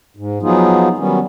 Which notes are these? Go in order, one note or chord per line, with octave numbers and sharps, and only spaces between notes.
G#2
F3 F#3 B3 D#4 F4 G#4
D#3 F#3 G3 B3 C#4